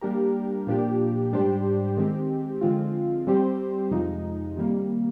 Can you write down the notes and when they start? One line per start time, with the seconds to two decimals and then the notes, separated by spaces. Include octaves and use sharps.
0.01 G3 A#3 D4 G4 A#4
0.67 A#2 F3 A#3 D4 G4
1.32 G#2 G3 D4 G4 C5
1.97 D#3 G#3 C4 G4
2.61 D3 F3 G#3 C4 F4
3.27 G3 C4 G4 C5
3.91 F2 C3 F3 G#3 D#4
4.56 C3 D#3 G3 A#3